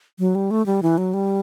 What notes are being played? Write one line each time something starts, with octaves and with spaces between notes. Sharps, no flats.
F#3
G3
A3
G3
E3
F#3
G3